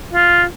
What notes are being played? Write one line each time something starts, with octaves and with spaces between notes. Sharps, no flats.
F4